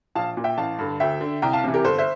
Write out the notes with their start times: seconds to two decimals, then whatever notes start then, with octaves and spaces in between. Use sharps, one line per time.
0.15 A#1 F5 A5
0.37 A#2
0.44 E5 G5
0.58 A1 F5 A5
0.79 G2 D3
1.00 D2 E5 G5
1.21 D3
1.42 C2 G5 A#5
1.53 F5 A5
1.64 C3 E3
1.74 G4 A#4
1.85 G1 A4 C5
1.98 C5 E5